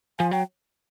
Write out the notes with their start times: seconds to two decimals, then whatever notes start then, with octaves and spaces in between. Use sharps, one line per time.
0.19 F3 G#5
0.31 F#3 G5